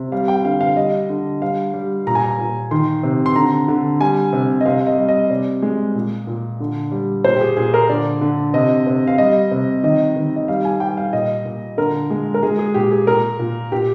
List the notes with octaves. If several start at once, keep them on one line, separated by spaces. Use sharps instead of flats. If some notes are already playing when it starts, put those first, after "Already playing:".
Already playing: C3
G3 F5
G5
D3 F5
F5
G3 D#5
D3
G3 F5
G3
A#2 A#5
G#5
A#5
A#2
D#3 C6
C3
C6
D3 A#5
D3
G3 G#5
C3
D#5
C3 F5
D#5
G3
D#5
C3 D5
G#3
A#2
A#2
D3
G3
A#2 C5
G4
G#4
A#2 G#4
A#4
D3 D5
D3
C3 D#5
C3
F5
G3 D#5
C3
D#3 D#5
D#3
D#5
G3 F5
G#5
G3 G5
F5
A#2 D#5
A#2
D3 A#4
G#3
A#4
G#3 G#4
G#4
A#2 G4
G#4
A#2 A#4
A#2
A#2 G4